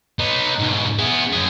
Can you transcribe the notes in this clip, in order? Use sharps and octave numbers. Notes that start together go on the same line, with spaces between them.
B3 D#4
G#2 B2
B3 G#4
F#2 G#4